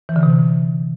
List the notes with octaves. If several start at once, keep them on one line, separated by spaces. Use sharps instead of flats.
E3
D3
C3